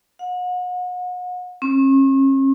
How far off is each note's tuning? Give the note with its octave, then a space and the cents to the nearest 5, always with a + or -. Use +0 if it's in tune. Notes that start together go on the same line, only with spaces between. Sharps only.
F#5 -40
C#4 -40